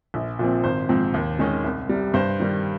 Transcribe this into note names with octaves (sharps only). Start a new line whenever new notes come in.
A#1
A#2 F3 C4
G#1 C5
G#2 F3 C4
D#2
D#3 G#3 C#4
C2
C3 G3
G2 C5
D#3 G3